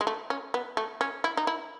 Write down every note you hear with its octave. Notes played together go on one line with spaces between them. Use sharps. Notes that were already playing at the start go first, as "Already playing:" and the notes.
G#3
A3
C#4
B3
A3
C#4
E4
D#4
E4